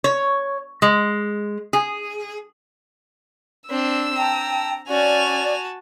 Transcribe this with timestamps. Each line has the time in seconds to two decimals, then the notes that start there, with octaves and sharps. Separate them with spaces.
0.04 C#5
0.82 G#3
1.73 G#4
3.70 C4 D4 E6
4.17 G5 A5 A#5
4.89 C#4 F#4 D5 G#5 A5 F7